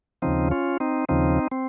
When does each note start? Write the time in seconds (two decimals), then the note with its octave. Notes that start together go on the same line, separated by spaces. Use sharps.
0.22 D#2 C#3 F3 C4 D#4
0.51 C#4 F4
0.80 C4 D#4
1.09 D#2 C#3 F3 C4 D#4
1.51 C4